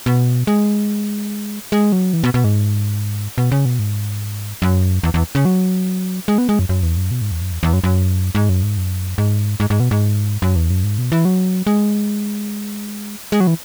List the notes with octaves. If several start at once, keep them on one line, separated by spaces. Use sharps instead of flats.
B2
G#3
G#3
F#3
E3
B2
B2
G#2
B2
C#3
B2
G#2
F#2
E2
E2
C#3
F#3
G#3
B3
G#3
F#2
F#2
E2
F#2
B2
G#2
E2
F#2
E2
E2
F#2
F#2
G#2
F#2
G#2
F#2
G#2
G#2
G#2
B2
G#2
F#2
E2
F#2
G#2
B2
E3
F#3
G#3
G#3
F#3
E3